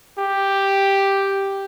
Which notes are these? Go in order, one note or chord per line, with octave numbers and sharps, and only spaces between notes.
G4